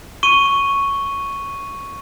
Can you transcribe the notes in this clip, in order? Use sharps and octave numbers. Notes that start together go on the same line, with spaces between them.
C#6 D#7